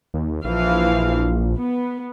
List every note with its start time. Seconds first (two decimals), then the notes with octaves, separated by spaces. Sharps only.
0.14 D#2
0.45 A#1 E3 F3 F5
1.58 B3